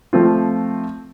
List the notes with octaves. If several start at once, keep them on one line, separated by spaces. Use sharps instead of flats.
F3 A3 C4 F4